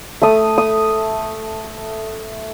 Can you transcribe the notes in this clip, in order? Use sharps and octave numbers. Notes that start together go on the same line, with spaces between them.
A3 D#6
D#6